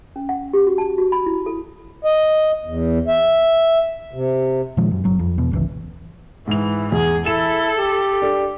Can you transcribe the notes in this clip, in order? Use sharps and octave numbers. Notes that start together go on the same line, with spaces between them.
C#4
F#5
G4
F#4
A5
F#4
B5
E4
A4
D#5
E2
E5
C3
A#2 D#3 F3 G#3
F#2
G1 F#3
F2
E2 B2
G#1 C#2 E3
G#2 E3 F7
E2 G#4
E4 A4 E7
G4
D4 A4